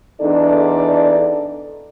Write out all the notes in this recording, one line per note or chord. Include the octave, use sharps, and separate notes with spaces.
E2 D4 D#4 A4 D5